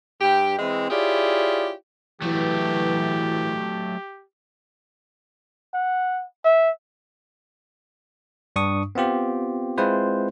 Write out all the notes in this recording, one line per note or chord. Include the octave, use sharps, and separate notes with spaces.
G2 G4 G5
E3 G#3 C4
E4 F4 G4 G#4 C#5 D5
E3 F#3 A3 G4
F#5
E5
G2 D4 C#6 D#6
B3 C4 F4 G4
G#3 C4 E4 F4 B4 C5